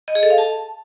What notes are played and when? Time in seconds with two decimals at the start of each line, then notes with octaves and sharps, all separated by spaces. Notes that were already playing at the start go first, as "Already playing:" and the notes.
0.08 D#5
0.15 G#4
0.23 A4
0.30 F5
0.38 A5